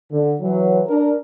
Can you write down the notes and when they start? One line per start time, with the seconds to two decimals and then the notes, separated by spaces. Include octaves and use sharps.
0.11 D3
0.40 E3 F#3
0.87 D4 A#4